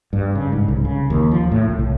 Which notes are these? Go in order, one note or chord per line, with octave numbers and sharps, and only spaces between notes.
G2
C#3
G#2
C2
C#3
D#2
F3
A2
C#2
C2